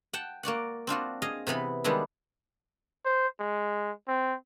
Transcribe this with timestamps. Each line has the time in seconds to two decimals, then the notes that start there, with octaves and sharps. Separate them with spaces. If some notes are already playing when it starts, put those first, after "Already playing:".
0.13 F#5 G5 A5
0.43 A#3 F#4 D5 F#5
0.87 C4 D4 F4 F#4
1.22 G#4 D#5 F5
1.47 C3 E3 B3 B5
1.84 D#3 G3 G#3 B3 D4 E4
3.05 C5
3.40 G#3
4.08 C4